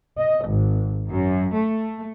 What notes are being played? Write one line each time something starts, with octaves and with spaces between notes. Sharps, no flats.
D#5
G#1
F#2
A3